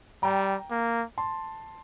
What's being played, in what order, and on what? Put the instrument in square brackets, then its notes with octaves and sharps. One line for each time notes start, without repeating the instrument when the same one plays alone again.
[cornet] G3 [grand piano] G5 A#5
[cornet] A#3
[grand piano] A5 C6